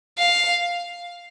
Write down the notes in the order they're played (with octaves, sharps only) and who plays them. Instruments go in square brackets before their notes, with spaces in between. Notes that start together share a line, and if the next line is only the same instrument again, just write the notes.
[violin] F5